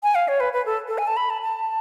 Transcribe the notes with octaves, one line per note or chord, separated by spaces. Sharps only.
G#5
F5
C#5
B4
B4
A4
A4
G#5
A5
B5
A5
A5